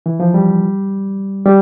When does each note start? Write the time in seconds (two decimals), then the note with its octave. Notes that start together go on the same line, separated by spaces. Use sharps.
0.06 E3
0.20 F3
0.34 G3
1.46 G3